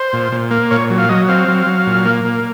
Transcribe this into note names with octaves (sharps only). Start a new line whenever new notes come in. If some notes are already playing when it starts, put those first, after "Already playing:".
Already playing: C5
A#2
A#2
A#3
A#2 C#5
F#3
F5
F#3 D#5
C4 F5
F#3
F#3
A#2
A#3
A#2